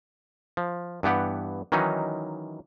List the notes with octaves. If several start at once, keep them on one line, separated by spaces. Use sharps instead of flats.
F3
G2 E3 B3 G4 F#5
D#3 E3 F#3 C#4 D#4